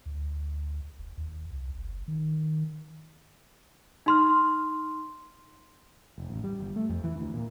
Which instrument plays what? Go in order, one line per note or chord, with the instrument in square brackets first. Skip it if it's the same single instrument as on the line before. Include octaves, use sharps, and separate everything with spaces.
[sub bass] D2
E1
D#2
C2
F#1
D#3
[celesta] D#4 C6 F6
[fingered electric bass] F1
A1
G3
G1
A3
F2
E3
D2
A#2